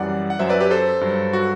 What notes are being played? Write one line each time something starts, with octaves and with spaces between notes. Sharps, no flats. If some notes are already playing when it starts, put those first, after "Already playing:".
Already playing: F#2 E3 G3 D5 F#5
F#5
F#2 F#3 C5 E5
B4 D5
G4 B4
A4 C5
G2 F#3
F#4